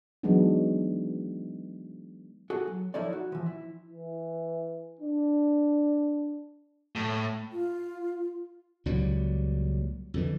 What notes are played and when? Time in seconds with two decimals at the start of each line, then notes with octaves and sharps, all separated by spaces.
0.23 E3 F#3 G#3 B3 D4 D#4
2.50 F#4 G#4 A4
2.67 F#3
2.94 F3 D#4 E4 A4 C#5 D5
3.13 F#4
3.32 E3 F3
3.46 E4
3.90 E3
5.01 D4
6.95 A2
7.52 F4
8.86 C#2 A#2 F#3 G3
10.14 F2 D3 E3